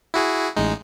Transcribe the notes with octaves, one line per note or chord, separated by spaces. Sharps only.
E4 F#4 G#4
A1 G#3 D#4